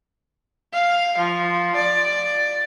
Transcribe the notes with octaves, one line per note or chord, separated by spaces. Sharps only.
F5
F3
D5